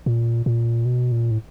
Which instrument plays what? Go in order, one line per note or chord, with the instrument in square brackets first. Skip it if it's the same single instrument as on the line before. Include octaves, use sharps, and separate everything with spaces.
[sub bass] A#2
A#2
B2
A#2
A2